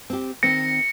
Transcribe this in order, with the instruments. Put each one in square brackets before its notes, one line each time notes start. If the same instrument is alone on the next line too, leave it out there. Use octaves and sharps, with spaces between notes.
[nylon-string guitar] C4 G4
[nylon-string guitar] D#3 C4 [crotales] A#6 C#7